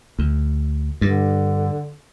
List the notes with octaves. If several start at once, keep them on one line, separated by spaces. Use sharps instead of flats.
D2
G2 D3